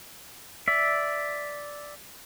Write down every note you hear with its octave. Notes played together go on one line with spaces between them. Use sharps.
D5 E5